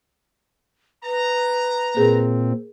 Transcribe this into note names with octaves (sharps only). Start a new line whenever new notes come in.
B4 A#5
A#2 C4 G#4 A#4